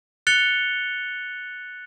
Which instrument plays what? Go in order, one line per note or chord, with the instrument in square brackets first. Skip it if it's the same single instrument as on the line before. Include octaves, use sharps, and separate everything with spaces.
[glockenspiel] F#6 A6 C#7 F7 G7